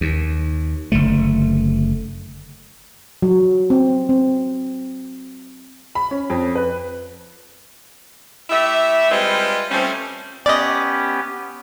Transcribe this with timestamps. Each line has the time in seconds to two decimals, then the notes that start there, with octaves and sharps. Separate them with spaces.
0.01 D#2
0.92 F#1 D3 A3
3.22 F#3
3.70 C4
4.09 C4
5.95 B5
6.11 C#4
6.30 F2
6.55 B4
8.50 A3 E4 G4 E5
9.10 G3 G#3 C4 F4 B4 D#5
9.71 F3 G3 A3 C4 C#4
10.46 B3 C#4 G4 D5 D#5